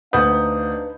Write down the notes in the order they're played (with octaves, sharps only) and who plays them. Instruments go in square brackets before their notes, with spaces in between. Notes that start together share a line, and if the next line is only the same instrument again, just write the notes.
[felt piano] D2 F#5 G6 [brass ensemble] D4 D#4 F5 [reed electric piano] B4 [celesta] D#6